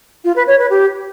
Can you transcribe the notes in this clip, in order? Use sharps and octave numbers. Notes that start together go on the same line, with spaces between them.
F4
B4
C#5
B4
G4